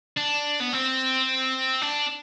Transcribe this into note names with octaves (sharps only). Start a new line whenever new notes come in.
D4
B3
C4
D4